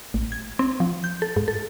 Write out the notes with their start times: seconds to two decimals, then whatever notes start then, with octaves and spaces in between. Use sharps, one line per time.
0.14 A1
0.32 G#6
0.59 C4
0.80 F3
1.04 G6
1.22 A4
1.36 G#2
1.48 A4